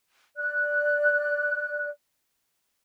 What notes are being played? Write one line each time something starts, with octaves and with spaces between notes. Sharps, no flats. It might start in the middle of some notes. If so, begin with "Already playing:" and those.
D5 F#6